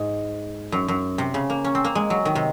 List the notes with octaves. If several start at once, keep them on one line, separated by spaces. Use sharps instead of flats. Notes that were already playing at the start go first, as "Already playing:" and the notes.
Already playing: G#2
F#2
F#2
C3
C#3
A#3
C#4
C4
A#3
G#3
F#3
D#3
C3